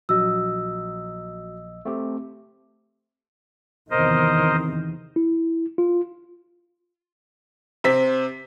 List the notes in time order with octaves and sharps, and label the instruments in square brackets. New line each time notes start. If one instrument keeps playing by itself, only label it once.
[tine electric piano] A#1 D#5 [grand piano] F#3 [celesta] E6
[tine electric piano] A3 C4 G4
[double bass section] E2 C3 D#3 [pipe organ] A#4 C5 D#5
[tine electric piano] E4
F4
[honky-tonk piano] C3 C4 B6